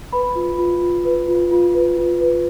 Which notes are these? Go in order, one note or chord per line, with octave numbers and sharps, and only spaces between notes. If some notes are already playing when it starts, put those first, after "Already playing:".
B4 B5
F4
F4
F4
B4
F4
F4
B4
F4
B4